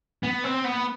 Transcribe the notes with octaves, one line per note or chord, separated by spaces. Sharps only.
B3
C4
B3